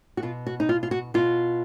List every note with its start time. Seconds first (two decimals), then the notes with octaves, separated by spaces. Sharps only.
0.17 F#4
0.23 B2 F4
0.46 F#4
0.60 D#4
0.69 F4
0.83 F4
0.91 F#4
1.14 B2 F4